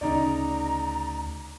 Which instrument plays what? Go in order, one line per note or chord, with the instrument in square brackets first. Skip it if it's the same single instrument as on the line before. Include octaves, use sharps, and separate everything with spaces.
[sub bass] D2 [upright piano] C#3 D#4 D5 [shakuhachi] A#5